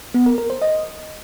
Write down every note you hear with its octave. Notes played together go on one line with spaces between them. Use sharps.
B3
A#4
A#4
C5
D#5